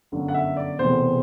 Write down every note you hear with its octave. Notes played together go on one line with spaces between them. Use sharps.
G1 F#2 D3 F#3
F#5
E5
D5
E1 E2 C3 E3 A3 C5